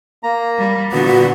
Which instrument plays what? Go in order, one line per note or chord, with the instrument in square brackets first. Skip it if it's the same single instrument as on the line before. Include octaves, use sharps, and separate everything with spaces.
[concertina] A#3 A#5
[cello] G3
[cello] A#2 D3 [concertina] B3 [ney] F#4